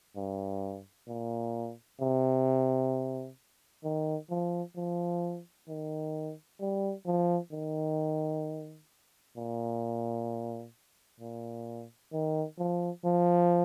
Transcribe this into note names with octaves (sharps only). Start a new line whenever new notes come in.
G2
A#2
C3
D#3
F3
F3
D#3
G3
F3
D#3
A#2
A#2
D#3
F3
F3